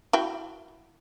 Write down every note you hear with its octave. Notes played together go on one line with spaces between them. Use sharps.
E4 F#4 G5